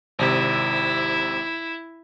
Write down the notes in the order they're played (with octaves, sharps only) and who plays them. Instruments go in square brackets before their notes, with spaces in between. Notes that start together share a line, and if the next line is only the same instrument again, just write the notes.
[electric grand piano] G#1 C3 [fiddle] E4